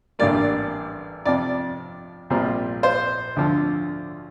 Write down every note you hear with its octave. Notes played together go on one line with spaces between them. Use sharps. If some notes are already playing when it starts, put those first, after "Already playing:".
A1 G2 D3 G3 A#3 D5
F2 C3 F3 D5
A#1 A#2 G3 C4
C5
D2 D3 F3